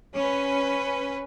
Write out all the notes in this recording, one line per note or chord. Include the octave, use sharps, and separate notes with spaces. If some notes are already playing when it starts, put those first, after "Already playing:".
C#4 B4